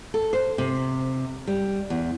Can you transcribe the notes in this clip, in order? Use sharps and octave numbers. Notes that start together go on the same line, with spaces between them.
A4
C5
C3
G3
E2